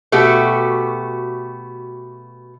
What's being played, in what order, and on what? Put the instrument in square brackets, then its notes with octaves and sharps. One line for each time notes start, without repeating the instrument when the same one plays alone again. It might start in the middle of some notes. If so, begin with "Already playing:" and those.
[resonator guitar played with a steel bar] B2 A3 F#4 G4